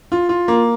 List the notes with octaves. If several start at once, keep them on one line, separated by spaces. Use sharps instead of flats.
F4
F4
A#3